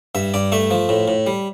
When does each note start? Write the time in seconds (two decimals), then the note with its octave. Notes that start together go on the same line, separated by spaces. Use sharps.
0.15 G2 E5
0.34 G2 D5
0.52 A3 E5
0.71 F3
0.89 A2
1.08 A2
1.27 G3